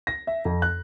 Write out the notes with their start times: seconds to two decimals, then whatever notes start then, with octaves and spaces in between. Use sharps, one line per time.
0.07 A#6
0.27 E5
0.45 F2
0.62 F#6